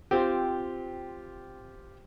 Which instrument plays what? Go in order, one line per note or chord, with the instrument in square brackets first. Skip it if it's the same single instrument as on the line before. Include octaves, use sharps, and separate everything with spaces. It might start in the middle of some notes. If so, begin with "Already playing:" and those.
[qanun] C4 [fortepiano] F4 G4